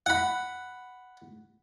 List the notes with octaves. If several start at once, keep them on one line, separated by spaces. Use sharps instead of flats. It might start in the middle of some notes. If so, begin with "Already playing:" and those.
F#5 B5